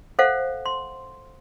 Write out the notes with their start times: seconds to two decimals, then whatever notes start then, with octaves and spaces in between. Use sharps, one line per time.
0.19 A4 C5 F5 F#5
0.66 C6